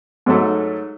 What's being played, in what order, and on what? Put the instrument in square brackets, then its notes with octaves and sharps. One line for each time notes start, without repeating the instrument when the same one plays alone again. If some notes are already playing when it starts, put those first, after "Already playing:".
[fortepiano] G#2 F#3 A3